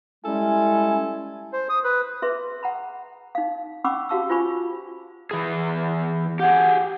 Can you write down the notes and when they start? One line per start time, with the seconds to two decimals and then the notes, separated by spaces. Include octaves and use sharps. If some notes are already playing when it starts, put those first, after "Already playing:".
0.25 G3 G#3 C#4 E4 A4 G#5
1.53 C5
1.69 D#6
1.84 B4
2.22 G#4 B4 E5 C6
2.63 F#5 A#5 B5
3.35 D#4 F5
3.84 C#4 F#5 B5 C#6 D6 E6
4.09 F#4 G4 F5 A5 C#6 E6
4.30 F4 C5 D5 G#5 B5 C#6
5.31 E3 G#4
6.40 G4 G#4 F#5